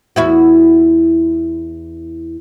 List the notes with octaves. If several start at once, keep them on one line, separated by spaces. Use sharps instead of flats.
E2 E4 F#4